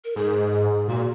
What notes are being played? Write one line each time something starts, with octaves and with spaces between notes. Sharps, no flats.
A#4
G#2 G#4
A#2 F#4